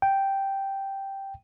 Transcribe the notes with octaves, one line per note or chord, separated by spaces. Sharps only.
G5